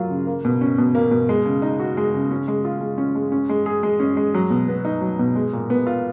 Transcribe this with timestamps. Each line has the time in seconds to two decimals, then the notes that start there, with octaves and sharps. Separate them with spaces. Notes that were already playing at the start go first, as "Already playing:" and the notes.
Already playing: F#3 A#3 F4
0.10 C#3
0.27 A#3
0.45 B2
0.61 C#4
0.78 B2
0.95 A#3
1.11 B2
1.29 G#3
1.45 C#3
1.62 D#4
1.80 F#4
1.97 G#3
2.14 C#3
2.31 C#4
2.48 G#3
2.65 F4
2.81 G#3
2.98 C#4
3.15 G#3
3.32 C#4
3.49 G#3
3.66 G#4
3.83 G#3
4.00 C#4
4.17 G#3
4.34 F#3
4.50 B2
4.68 B3
4.85 D#4
5.01 F#3
5.19 B2
5.36 G#3
5.53 A#2
5.70 B3
5.87 F4